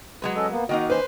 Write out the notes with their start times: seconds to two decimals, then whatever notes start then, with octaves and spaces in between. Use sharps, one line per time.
0.22 F#3 G#3 B4
0.36 C#4 A4 D#5
0.51 A#3 B3
0.69 D#3 A#3 D#4 F#4 D#5
0.90 C#4 B4 C5